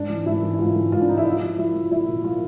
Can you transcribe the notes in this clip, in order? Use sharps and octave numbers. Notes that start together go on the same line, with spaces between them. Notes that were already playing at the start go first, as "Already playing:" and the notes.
Already playing: G#2 D4
E3
G#2 E4
E3
E4
G#2 F4
E3
G#2 F4
D4
E3 D#4
E4
F3 F4
F3
F3 E4
F3
F3 E4
A#2
F3 F4